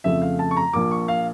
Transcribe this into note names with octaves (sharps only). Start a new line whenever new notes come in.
F2 C#3 F3 A3 E5
F5
A5
C#6
A#5
A#1 A#2 F3 A#3 D6
C#6
F5